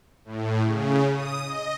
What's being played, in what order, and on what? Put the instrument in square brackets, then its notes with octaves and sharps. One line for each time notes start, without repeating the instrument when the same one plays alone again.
[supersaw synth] A2
C#3
D#6
D#5